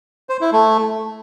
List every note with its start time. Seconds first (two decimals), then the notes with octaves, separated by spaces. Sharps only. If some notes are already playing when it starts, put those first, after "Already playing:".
0.29 C5
0.41 E4
0.53 A3